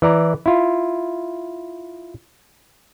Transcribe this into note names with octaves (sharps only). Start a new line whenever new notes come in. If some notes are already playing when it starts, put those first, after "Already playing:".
E3 D5 A#5
E4 F4